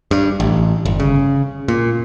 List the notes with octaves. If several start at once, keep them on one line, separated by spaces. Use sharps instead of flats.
G2
A1
G1
C#3
A#2